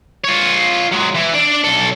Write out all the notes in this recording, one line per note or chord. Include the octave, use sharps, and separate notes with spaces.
F4 C#5
F#3 G#3
E3
D4 D5
B1 A4